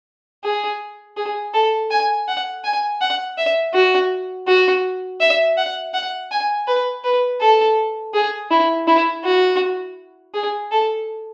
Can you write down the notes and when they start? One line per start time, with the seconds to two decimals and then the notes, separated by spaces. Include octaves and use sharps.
0.44 G#4
1.17 G#4
1.54 A4
1.91 G#5
2.28 F#5
2.64 G#5
3.01 F#5
3.37 E5
3.74 F#4
4.47 F#4
5.20 E5
5.57 F#5
5.94 F#5
6.31 G#5
6.67 B4
7.04 B4
7.41 A4
8.14 G#4
8.51 E4
8.87 E4
9.24 F#4
10.34 G#4
10.71 A4